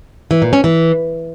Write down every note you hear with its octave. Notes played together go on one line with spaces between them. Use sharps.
E3
A#2
C#4
E3